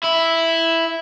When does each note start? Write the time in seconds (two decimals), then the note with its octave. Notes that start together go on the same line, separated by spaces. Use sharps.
0.03 E4